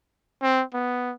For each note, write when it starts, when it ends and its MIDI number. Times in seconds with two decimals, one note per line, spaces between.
0.42 0.63 60
0.74 1.13 59